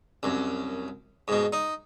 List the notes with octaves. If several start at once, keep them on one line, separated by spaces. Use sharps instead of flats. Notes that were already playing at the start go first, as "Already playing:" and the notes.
C2 F#2
G#2 B2
D#4